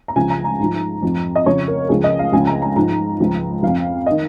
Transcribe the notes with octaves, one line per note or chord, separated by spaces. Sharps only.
A#5
C#2 C#3 F3 G#5
A#5
A#5
G#2 F3
F2 F3
D#5
F2 C#3 F3 C#5
A#4
C#2 C#3 F3 G#4
D#5
F5
C#2 C#3 F3 G#5
A#5
A#5
G#2 F3 A#5
C#2 C#3 F3
F2 F3 F5
D#3 D#5